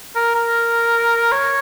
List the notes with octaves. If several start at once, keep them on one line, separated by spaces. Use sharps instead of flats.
A#4
A#4
C#5